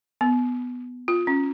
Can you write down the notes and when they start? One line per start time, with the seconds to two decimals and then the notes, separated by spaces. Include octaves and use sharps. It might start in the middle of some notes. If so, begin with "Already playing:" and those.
0.21 B3
1.08 F4
1.27 C#4